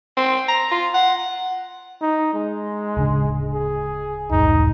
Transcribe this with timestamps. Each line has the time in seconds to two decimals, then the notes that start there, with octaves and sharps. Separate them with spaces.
0.17 C4
0.49 A#5
0.71 F4
0.94 F#5
2.01 D#4
2.34 G#3
2.96 D1 C#3 D4
3.54 G#4
4.31 E1 C2 G#2 D#4